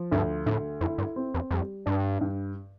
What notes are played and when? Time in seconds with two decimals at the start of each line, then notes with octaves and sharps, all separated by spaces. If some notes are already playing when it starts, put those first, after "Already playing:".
Already playing: F3
0.12 D2 G2
0.46 D2 A2
0.81 F2 E4
0.98 G2
1.16 C4
1.34 E2
1.51 F2 G3
1.86 G2 D4
2.21 G2